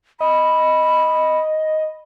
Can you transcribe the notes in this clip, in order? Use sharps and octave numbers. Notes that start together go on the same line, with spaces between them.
D#5 B5